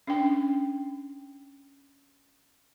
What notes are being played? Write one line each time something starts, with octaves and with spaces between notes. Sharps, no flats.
C#4 D4 G5